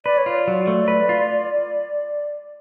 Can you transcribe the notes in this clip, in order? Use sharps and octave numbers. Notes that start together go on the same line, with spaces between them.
B4 D5
C#5
F4 D5
F#3
A3
B4
F4